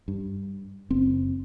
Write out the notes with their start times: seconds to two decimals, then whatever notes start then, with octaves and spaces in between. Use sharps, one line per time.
0.08 G2
0.90 F#1 C4